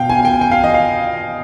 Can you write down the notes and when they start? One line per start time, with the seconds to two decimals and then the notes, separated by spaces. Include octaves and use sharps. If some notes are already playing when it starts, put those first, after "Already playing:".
Already playing: B2 F5 G5
0.09 G#5
0.25 G5
0.41 G5
0.51 F5
0.64 D#5
0.74 F5